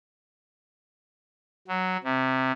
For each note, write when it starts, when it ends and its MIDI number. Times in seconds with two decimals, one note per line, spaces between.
1.68 1.97 54
2.04 2.52 48